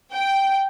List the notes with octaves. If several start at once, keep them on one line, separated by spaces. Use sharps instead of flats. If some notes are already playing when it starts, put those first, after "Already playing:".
G5